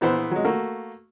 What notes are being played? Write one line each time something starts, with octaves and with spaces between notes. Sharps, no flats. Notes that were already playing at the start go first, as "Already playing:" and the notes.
A#1 E3 B3 C5
F#3 G#3
A3 A#3 F#4